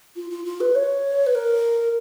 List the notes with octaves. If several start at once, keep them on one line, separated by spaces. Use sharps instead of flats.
F4
F4
F4
B4
C#5
B4
A#4